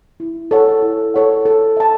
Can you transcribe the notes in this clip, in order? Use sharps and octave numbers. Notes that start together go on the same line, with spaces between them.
E4
A4 C#5 F#5
E4
A4 C#5 F#5
A4
E5 A5